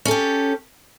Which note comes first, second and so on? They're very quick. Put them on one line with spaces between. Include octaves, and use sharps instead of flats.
C#4 A4 G4